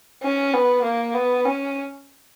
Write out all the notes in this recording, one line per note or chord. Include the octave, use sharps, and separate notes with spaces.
C#4
B3
A#3
B3
C#4